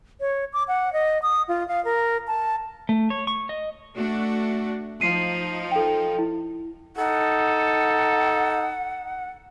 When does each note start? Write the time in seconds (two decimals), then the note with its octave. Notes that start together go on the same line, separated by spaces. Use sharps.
0.20 C#5
0.53 D6
0.68 F#5
0.93 D#5
1.22 D#6
1.48 F4
1.68 F5
1.85 A#4
2.27 A5
2.89 A3
3.10 C#5
3.27 C#6
3.49 D#5
3.94 A3 D4 F#4
5.01 F3 D#4 C7 D#7
5.72 A4 G5
6.19 E4
6.97 D#4 A4 F#5